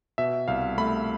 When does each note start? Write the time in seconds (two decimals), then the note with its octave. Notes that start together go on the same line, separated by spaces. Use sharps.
0.18 B2 E5
0.48 C2 F5
0.78 A3 B5